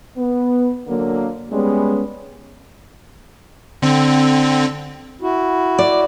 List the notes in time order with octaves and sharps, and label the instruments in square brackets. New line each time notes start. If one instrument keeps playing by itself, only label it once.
[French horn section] B3
D3 F#3 A#3
G3 G#3 B3 C#4
[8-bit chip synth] D3 C4
[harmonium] E4 F#4
[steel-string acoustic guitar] D5